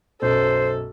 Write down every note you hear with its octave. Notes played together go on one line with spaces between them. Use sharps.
B1 F#2 A4 C5